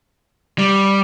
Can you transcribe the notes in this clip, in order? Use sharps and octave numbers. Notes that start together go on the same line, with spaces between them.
G3